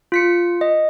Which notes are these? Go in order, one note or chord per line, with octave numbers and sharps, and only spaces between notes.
F4 B6 C#7
D#5